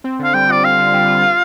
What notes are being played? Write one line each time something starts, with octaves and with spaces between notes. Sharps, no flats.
C4
D3 F5
G3 G5
F4 D5
C4 F5
D3
G3
F4
F4